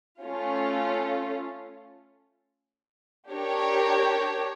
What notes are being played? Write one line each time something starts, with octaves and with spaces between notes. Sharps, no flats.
A3 C#4 F4
D4 G4 A#4 C#5